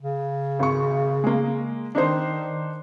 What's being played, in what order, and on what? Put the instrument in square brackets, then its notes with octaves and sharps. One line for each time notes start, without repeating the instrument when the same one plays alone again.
[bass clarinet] C#3
[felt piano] G#1 C#6
G#3 A#3
[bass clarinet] D#3 [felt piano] D4 D#4 C5